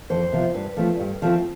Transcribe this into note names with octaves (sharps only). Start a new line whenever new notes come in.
F2 C5
C3 F3 B3
G2 B4
F3 A3 C4
G2
F3 A3 C4